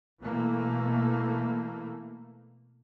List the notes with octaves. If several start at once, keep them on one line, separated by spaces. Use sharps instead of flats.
B2 E3 A3 A#3